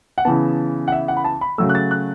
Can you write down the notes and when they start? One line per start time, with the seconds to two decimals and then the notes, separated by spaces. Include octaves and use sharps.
0.18 F#5
0.25 C#3 E3 B3 A5
0.88 F#5
0.92 E5
1.08 F#5
1.17 B5
1.24 A5
1.41 B5
1.58 C#3 F#3 A3 E6
1.69 F#6
1.75 A6
1.91 F#6